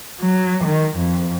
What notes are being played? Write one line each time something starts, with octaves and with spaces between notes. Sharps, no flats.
F#3
D#3
F2